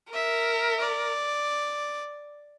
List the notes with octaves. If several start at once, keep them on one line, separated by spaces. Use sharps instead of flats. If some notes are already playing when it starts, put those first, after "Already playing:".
A#4 E5
D5